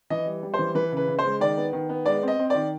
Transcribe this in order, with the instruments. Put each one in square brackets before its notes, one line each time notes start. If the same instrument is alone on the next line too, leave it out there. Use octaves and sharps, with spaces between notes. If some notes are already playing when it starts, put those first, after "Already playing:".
[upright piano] E3 D#5
G3
G3
C5
E3
E3 B4
C#3 B4
C#3
C5
G#3
D#3 D5
B3
D#3
B3
G#3 D5
C4 D#5
C4
D#3 D5